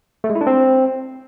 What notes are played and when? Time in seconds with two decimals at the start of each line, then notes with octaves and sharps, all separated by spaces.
0.24 A3
0.30 G#3
0.35 E4
0.41 D4
0.47 C4